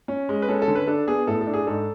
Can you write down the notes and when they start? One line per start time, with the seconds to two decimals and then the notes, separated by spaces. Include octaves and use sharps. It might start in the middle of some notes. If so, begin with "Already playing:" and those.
0.08 C#4
0.29 G#3
0.42 B4
0.48 C#4 A4
0.62 A4
0.68 D3
0.75 B4
0.87 D4 A4
1.07 B3 G#4
1.27 A2 A4
1.41 A4
1.47 D4
1.54 G#4
1.67 G#2 A4